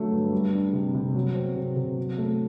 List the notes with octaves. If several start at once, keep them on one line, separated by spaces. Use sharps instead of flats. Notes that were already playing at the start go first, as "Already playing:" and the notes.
Already playing: D3 F#3 A3
G2
G3
D4
C3
C3
F#3
C4
C3
C3
F#3
A3